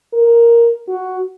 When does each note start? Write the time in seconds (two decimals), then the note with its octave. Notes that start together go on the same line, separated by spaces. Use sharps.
0.14 A#4
0.88 F#4